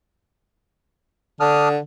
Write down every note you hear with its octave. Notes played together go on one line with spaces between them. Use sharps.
D3 D4 D#6 F6